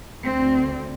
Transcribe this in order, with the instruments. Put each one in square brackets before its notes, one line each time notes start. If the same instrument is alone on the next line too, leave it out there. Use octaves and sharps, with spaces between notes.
[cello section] D2 D3 C4